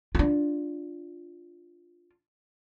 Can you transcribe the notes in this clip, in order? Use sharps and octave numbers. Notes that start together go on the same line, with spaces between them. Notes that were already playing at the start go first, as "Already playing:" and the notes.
D4 F4